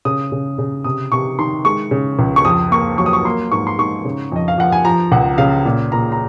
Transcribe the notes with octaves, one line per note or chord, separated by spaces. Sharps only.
C#3 D#6
C#3
C#3
C3 D#6
C3 C#6
D#3 C6
G#3 C#6
C#3
C#2
C#6
F2 D#6
A#3 C#6
F#3 C#6
D#6
C#6
A#3 C6
G#2 C#6
C6
G#2 C#6
C#3
F2 D#5
F5
F3 F#5
G#5
F3 A#5
C#2 F#5
C#3 F5
A#2
A#2 A#5
A#5